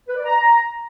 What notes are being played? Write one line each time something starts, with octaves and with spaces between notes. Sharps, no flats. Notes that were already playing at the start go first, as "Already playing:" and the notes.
B4
D5
A#5